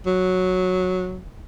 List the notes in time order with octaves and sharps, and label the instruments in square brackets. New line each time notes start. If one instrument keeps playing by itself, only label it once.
[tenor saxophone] F#3